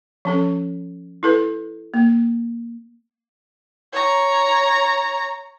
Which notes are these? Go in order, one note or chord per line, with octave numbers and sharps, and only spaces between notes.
F3 C#4 A4
E4 A4 B4
A#3
C#5 A#5